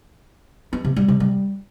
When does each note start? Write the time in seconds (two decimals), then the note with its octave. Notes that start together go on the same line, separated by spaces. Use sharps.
0.73 B3
0.85 C3
0.96 G3
1.08 C3
1.20 G3